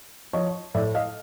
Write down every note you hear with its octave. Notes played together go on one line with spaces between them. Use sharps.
F3 C#5 D#5
A2 D5 E5
D#5 F5